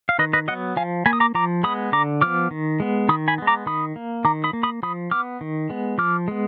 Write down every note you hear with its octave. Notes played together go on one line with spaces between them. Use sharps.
F5
D#3 B4 D#5
B4 D#5
F#3 B3 D#5 F#5
F3 F5 G#5
A#3 G#5 B5
D#6
A#5 D6
F3 A#5 D6
G#3 B3 B5 D#6
D3 A#5 D6
F3 B3 D6 F6
D#3
G#3 B3
D#3 B5 D#6
G#5 B5
G#3 B3
A#5 D6
D#3 B5 D#6
A#3
D#3 A#5 D6
B5 D#6
A#3
B5 D#6
F3 B5 D#6
B3 D6 F6
D#3
G#3 B3
F3 D6 F6
G#3 B3